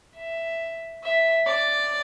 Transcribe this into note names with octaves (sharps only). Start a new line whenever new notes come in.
E5
E5
D5